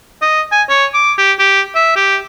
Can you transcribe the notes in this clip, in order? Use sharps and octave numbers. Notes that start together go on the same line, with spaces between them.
D#5
G#5
C#5
D6
G4
G4
E5
G4